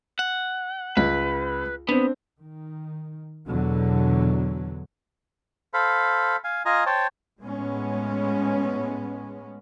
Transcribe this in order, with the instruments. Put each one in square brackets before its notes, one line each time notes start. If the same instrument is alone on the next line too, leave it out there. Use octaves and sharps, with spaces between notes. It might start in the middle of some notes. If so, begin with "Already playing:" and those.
[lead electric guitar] F#5
[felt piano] C#2 [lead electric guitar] B4
[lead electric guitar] B3 [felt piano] C4 D4
[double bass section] D#3
E2 B2 D3 F#3
[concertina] A4 C5 F5 B5
F5 G#5
F4 D#5 G#5 A#5
C5 C#5 G5 A5
[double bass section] A2 G#3 B3 C#4